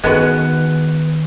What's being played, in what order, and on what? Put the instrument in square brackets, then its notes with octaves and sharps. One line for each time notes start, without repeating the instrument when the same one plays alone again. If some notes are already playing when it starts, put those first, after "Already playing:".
[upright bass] D#3 [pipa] G#3 B3 F#4 B4